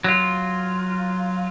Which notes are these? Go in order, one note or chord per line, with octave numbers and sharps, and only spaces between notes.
F#3 F4